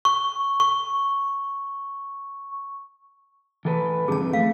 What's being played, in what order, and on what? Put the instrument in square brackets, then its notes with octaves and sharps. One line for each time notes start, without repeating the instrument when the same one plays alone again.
[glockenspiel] C#6
C#6
[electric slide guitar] E3 A4 B4
[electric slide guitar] F2 G#2 D3 [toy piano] G#4 A5
[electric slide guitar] F2 E3
[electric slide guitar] A3 [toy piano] F5